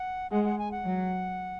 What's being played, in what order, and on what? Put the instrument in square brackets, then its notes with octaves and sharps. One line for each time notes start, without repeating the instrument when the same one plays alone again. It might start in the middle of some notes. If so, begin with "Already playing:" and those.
Already playing: [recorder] F#5
[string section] G#3 [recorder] F#5
[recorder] F#5
G#5
F#5
[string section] F#3